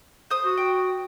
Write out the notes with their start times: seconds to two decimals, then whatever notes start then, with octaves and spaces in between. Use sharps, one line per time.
0.30 C5 D#6
0.45 F#4
0.57 G5